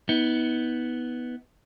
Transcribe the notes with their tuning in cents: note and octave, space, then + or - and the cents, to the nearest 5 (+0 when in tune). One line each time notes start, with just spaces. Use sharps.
B3 +0 D#4 +40